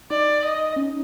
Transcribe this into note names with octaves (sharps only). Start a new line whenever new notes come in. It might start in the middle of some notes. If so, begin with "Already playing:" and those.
D#4 D5
D#5
C#4